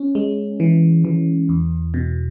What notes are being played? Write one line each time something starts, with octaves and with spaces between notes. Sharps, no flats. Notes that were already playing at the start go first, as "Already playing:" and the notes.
Already playing: C#4
G#3
E3
E3
E2
B2